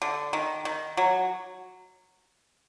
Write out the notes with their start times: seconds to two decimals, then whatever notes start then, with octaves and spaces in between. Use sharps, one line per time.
0.02 D3
0.33 D#3
0.65 D#3
0.97 F#3